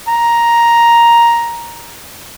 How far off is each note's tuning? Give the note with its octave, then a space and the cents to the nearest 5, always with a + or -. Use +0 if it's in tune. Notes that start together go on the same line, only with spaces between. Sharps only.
A#5 +5